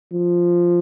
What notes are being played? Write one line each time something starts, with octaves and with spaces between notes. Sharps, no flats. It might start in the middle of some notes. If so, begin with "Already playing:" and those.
F3